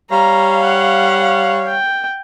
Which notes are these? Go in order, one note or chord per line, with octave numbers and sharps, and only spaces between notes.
G3 C#5 F5 A#5
F#5
G5